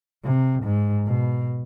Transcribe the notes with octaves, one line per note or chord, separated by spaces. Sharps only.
C3
G#2
B2